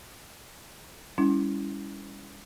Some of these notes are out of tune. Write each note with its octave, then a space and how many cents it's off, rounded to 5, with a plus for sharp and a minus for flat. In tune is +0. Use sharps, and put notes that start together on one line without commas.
G3 +40 C#4 +20 E4 +0